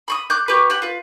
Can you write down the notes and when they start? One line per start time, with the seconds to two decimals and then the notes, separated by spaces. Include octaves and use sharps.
0.08 B5 C#6 D#6
0.30 D6 F#6 G6
0.48 F#4 G4 B4
0.70 G4 F#5
0.82 F4 B4